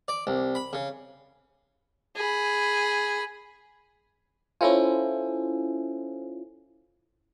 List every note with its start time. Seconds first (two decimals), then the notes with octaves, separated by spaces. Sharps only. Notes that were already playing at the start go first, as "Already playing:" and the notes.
0.08 D5
0.27 C2
0.55 B5
0.73 C#3
2.16 G#4 B5
4.61 C#4 E4 F4 A4 C5 G#5